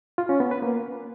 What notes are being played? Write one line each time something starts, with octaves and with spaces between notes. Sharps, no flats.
F4
C#4
B3
B4
A#3